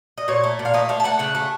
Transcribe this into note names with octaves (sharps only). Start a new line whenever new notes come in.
D#5
A#2 C#5
A3
A#2
F5
A3 D#5
A3 F5
A5
A3 F#5
C#3 F#5
A3